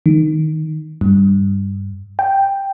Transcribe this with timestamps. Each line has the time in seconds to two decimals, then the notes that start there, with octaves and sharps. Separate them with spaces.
0.06 D#3
1.01 G2
2.19 G5